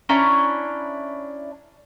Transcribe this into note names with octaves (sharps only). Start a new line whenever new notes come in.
C#4 D4 E4 A#5